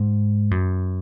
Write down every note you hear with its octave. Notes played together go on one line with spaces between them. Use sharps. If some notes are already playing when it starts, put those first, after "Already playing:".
Already playing: G#2
F#2